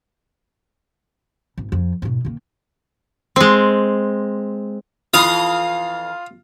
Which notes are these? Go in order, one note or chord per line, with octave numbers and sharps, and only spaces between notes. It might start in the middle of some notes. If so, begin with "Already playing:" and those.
G#1
F2
G#2 B2
D#3 A#3
G#3 C4
F2 E3 F4 A4 F5 D#6